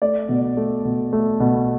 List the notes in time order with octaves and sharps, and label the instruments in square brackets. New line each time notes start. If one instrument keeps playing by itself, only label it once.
[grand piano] A3 D5
B2
A3
B2
A3
B2